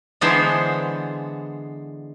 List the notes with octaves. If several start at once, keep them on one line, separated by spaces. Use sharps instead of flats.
D3 E3 G#3 B3 D4 C5